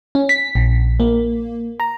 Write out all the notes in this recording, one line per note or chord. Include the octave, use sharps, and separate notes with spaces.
C#4
B6
A#1
A#3
A#5